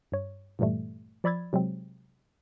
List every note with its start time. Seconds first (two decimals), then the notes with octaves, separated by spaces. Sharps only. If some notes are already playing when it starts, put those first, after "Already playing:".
0.12 G2 C#5
0.59 G2 A#2 E3 G3 A3
1.24 F3 D5 B5 E6 G#6 A6
1.53 C3 F#3 G#3 C4